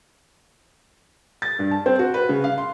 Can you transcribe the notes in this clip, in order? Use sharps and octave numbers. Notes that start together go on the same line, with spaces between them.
A6
G2
A5
C4
F#4
B4
C#3
F5
C6